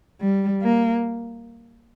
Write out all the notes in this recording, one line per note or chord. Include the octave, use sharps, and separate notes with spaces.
G3
A#3